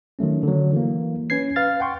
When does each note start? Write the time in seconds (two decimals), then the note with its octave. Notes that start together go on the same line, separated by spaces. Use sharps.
0.19 D#3 F#3 A3 C#4
0.43 D3 F#3
0.73 E3 A#3
1.30 C#4 B4 G#6 C7
1.56 B4 F5 F6 A6
1.80 F#5 G5 C6 C#6